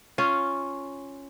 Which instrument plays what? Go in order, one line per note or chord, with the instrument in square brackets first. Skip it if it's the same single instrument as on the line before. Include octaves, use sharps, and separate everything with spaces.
[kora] C#4 F4